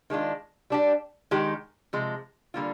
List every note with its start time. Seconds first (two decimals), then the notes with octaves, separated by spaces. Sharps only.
0.10 D#3 G#3 D4 F4
0.70 G3 D4 G4
1.31 D#3 G#3 D#4 G4
1.93 C3 F3 G#3
2.54 D3 G3 A#3 F4